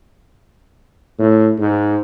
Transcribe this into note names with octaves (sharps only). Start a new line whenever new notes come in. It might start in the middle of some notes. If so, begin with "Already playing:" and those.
A2
G#2